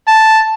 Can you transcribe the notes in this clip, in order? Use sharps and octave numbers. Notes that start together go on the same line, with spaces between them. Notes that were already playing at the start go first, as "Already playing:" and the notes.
A5